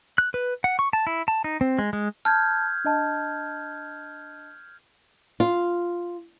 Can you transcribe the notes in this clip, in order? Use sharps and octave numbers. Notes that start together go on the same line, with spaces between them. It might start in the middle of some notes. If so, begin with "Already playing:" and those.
F#6
B4
F#5
C#6
A5
E4
A5
D#4
C4
G#3
G#3
A5 F6 G6 G#6
D4 D#5 A5
F4